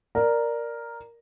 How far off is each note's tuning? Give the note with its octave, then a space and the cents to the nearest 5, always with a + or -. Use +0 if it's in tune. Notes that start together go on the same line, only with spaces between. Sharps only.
A#4 +0 D5 +5